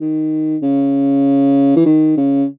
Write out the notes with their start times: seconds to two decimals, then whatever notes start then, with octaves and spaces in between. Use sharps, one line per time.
0.01 D#3
0.63 C#3
1.76 E3
1.86 D#3
2.17 C#3